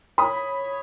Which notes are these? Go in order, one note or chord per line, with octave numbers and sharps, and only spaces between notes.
C#5 B5 D#6